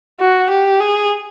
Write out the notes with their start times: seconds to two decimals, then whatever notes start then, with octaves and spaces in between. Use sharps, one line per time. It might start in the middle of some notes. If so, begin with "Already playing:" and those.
0.20 F#4
0.50 G4
0.80 G#4